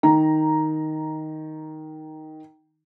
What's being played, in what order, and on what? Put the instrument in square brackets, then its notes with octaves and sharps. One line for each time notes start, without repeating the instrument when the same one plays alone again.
[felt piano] D#3 A#5